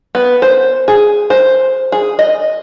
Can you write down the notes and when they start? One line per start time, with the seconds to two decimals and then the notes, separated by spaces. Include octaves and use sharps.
0.15 B3
0.42 C5
0.88 G#4
1.30 C5
1.92 G#4
2.19 D#5